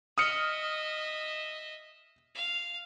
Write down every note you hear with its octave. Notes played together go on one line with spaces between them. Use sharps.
D#5 E5 D#6 F6 C#7
F5